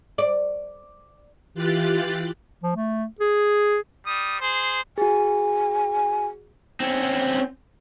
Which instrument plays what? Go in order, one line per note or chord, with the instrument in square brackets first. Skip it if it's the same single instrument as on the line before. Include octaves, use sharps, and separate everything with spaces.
[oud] D5
[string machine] E3 F4 G4 F#6 A6
[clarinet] F3
A3
G#4
[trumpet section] G3 D#6
G#4 C5
[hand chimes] F#4 G#4 [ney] G#5
[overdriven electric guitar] C4 C#4